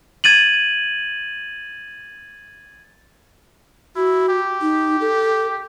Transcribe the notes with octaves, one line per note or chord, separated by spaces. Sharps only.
G#6 A6 D#7 F#7
E4 F#4
G4
D#4
A4